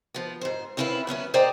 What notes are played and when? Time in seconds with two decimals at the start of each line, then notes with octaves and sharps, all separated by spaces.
0.14 F3 B3
0.41 G#2 C5
0.77 C4 C#4 E4 F4 A#4 B4
1.07 F#3 B3 C#4 E4
1.34 G#4 C5 D5 D#5 G5 A#5